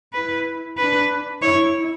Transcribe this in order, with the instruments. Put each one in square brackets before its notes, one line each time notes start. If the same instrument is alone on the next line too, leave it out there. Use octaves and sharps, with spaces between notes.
[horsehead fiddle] E4 [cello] B4
[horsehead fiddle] D4 [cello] B4
[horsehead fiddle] E4 [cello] C#5